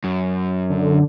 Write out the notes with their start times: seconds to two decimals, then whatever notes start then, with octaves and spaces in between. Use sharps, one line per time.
0.04 F#2
0.70 D3